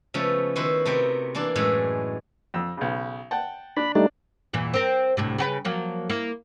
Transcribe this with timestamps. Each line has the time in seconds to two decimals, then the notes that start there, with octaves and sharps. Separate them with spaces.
0.14 C#3 F3 G#3 A3 B3 A4
0.56 D#3 B3 E4 F#4 B4 C5
0.85 C3 A3 B3 A#4 G5
1.35 E3 A#3 D4 D5
1.55 F#2 A2 E3 G#3 G#4 E5
2.54 F2 E6
2.77 B1 C#3
3.31 F#5 G5 A5
3.77 D4 B5
3.95 G3 A3 D4 D#4
4.53 E2 A#2 E3
4.74 C4 A#4
5.17 D2 A2 C3
5.38 C#3 F#4 B4
5.65 F3 F#3 A#3
6.10 A#3 E4